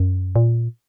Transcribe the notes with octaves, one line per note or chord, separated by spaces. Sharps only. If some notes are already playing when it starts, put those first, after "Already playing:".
Already playing: F#2
A#2